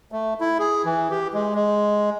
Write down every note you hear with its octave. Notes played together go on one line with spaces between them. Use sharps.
A3
E4
G#4
E3
G4
G#3
G#3